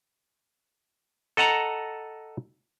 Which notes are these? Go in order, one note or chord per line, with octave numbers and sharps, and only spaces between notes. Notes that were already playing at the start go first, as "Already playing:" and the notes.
A4 D#5 F#5 A5 A#5